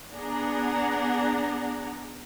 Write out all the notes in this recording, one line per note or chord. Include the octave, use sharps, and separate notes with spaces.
B3 D4 G#4 F#5 A#5